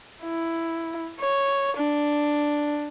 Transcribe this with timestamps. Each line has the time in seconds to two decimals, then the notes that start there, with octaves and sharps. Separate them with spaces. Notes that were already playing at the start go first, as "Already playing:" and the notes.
0.23 E4
1.20 C#5
1.77 D4